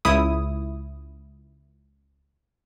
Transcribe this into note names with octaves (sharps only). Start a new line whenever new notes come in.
C#2 E4 D#6